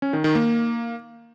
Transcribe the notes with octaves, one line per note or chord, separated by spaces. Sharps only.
C#4
D#3
D#3
A#3